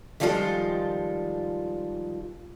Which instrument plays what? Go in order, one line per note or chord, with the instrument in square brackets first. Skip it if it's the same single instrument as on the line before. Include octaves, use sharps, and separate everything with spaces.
[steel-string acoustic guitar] D#3 F3 G3 G#3 F4 A4